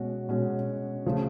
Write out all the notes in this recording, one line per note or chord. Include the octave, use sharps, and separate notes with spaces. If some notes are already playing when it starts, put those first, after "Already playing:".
Already playing: B2 G#3 C#4 F#4
B2 G#3 C#4 F#4
C#3 F3 A3